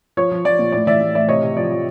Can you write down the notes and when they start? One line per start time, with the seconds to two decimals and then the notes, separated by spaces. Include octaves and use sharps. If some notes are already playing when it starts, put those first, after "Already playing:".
0.17 F3 C#5
0.31 F3
0.45 F3 D5
0.59 A#2
0.72 A2 D5
0.87 E3 D5 E5
1.00 A2
1.15 A2 D5 E5
1.29 C3 C#5 D#5
1.43 C3
1.56 F3 D5
1.71 F3